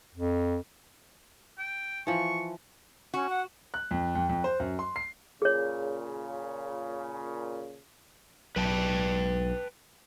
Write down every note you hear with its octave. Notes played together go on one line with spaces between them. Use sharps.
F2
G5
E3 F3 C#6
C#4 F#4
F#5
F#6
F2
F2
F2
C5
F#2
C6
C7
A#2 C#3 G#4 C#5
B1 B4 G5 A5